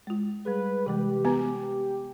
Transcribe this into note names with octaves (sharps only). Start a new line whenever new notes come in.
G#3 F4
G3 G#4 B4
C3 E3 G#3 G4
B3 B4 A#5